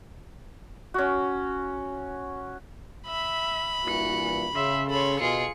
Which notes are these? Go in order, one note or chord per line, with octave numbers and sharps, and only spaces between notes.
C#4 F#4
E5 B5
G2 A#2 E3 F#4 C#7
C#3 E5 C6
A4 C#5 B5 C6
B2 F4 G#4 C#7